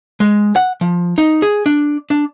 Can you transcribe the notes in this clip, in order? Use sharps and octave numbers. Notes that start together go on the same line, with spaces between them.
G#3
F#5
F3
D#4
G#4
D4
D4